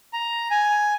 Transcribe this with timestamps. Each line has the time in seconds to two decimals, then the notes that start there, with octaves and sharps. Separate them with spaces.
0.13 A#5
0.51 G#5